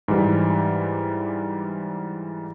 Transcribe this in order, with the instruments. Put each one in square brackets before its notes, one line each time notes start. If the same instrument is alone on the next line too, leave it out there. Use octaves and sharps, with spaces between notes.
[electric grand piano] G#2 E3 G3